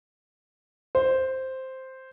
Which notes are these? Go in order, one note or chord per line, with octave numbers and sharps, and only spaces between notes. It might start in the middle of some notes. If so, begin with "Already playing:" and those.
C5